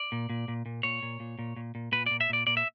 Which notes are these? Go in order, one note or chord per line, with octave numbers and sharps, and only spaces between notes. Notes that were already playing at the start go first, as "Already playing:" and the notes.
Already playing: D5
A#2
A#2
A#2
A#2
A#2 C#5
A#2
A#2
A#2
A#2
A#2
A#2 B4
A#2 D5
E5
A#2 D5
A#2 D5
E5